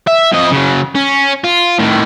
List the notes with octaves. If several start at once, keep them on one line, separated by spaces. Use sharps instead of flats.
E5
F2 D#5
C#3 F#3
C#4
F4
A2 D#3